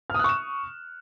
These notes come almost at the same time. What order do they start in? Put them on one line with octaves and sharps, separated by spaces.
F6 D#6 F#6 C#6 E7